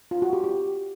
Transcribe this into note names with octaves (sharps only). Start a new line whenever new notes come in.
F4
F#4
G4
G4